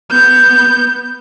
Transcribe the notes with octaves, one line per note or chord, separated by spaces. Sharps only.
B3 G6